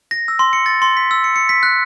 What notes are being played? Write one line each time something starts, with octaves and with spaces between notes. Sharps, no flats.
A#6
E6
C6
C#7
A6
C6
B6
E6
C#7
C#7
B6
F#6